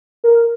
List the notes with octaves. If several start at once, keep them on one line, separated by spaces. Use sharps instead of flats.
A#4